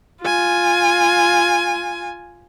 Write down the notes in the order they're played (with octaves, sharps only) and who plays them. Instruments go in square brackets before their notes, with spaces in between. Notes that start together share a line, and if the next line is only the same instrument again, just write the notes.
[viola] F4 G#5